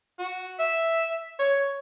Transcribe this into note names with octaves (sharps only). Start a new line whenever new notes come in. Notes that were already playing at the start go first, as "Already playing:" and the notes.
F#4
E5
C#5